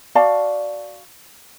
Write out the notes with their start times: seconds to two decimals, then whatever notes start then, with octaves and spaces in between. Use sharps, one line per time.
0.15 F#4 D5 F5 A5